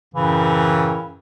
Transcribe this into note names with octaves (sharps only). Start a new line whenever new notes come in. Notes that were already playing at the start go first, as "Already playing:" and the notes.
F#2 A2 C#3 E3